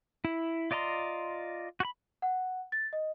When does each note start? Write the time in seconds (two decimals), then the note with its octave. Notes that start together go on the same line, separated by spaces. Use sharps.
0.25 E4
0.71 F4 D5 D#5 A#5 C6
1.80 F#4 B5
2.22 F#5
2.72 A6
2.93 D#5